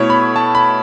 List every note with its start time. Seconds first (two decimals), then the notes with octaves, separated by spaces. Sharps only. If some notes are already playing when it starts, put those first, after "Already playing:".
Already playing: B2 A3 E4 C#5
0.10 B5
0.36 A5
0.55 B5